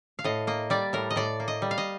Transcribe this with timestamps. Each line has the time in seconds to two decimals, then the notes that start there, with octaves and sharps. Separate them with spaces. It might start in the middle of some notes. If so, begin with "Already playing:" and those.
0.19 F5
0.24 A2 D#5
0.47 A#3 D#5
0.70 G3 D5
0.93 A2 A#4
1.10 D#5
1.16 A2 D5
1.40 A#3
1.48 D#5
1.62 G3
1.71 F5
1.78 D#5